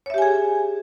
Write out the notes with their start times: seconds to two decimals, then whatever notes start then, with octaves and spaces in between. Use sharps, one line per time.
0.06 C#5
0.10 E5
0.14 G4
0.18 G#5
0.22 G#4